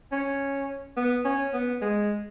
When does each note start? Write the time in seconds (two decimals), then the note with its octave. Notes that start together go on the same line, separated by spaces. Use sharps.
0.12 C#4
0.97 B3
1.25 C#4
1.53 B3
1.82 G#3